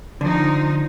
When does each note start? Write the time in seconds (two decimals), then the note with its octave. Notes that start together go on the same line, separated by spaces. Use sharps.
0.21 D3 F3 D#4